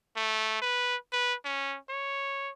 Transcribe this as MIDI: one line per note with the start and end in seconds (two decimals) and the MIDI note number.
0.16 0.57 57
0.62 0.96 71
1.12 1.34 71
1.45 1.77 61
1.89 2.51 73